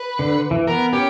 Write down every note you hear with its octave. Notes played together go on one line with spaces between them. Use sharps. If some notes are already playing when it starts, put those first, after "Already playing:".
Already playing: B4
D3
E3
B3 A#4
C#4 G4